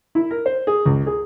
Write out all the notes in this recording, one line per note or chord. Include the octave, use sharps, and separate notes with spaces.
E4
A#4
C5
G#4
C#2
G#4